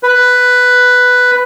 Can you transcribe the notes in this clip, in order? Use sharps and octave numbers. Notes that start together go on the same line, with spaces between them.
B4